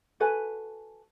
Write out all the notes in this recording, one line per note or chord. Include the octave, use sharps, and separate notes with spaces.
F#4 A4 B4 G#5